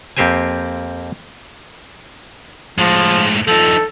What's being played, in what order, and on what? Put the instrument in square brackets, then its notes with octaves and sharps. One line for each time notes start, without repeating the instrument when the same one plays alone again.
[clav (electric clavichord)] F2 A#3 C4 G4 C5 G#5
[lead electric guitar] A2 G#3 [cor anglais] F3
[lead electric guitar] F3 D#4 [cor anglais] A4